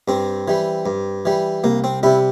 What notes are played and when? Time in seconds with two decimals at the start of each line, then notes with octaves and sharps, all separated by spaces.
0.08 G2 C4
0.48 E3 G3
0.86 G2
1.25 E3 G3
1.64 C2 A#3
1.84 C4
2.03 C3 G3 E4